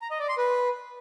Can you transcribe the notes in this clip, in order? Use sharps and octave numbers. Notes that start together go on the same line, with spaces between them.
A#5
D#5
D5
C6
B4